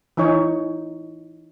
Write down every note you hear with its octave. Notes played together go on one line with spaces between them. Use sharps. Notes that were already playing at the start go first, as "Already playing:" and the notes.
E3 D#4 C#5